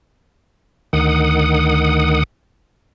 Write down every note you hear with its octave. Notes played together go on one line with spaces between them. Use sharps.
D2 D#3 F#5 D#6